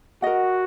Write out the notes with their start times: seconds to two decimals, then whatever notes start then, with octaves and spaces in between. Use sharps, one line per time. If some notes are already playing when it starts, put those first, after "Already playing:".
0.22 F#4 A#4 D#5 F#5